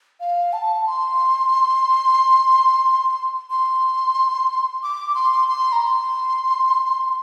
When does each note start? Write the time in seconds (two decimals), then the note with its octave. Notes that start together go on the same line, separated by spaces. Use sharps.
0.20 F5
0.53 A5
0.87 C6
3.50 C6
4.83 D6
5.15 C6
5.49 C6
5.72 A#5
5.81 C6